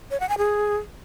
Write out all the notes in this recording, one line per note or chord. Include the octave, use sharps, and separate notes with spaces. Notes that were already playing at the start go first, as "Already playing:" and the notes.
C#5
F#5
G#5
G#4